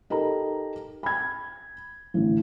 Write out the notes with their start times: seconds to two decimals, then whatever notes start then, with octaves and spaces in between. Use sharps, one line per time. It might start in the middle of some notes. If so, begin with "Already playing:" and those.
0.10 D#4 G4 A4 A#4 A#5
1.03 B5 G#6
2.14 A1 D3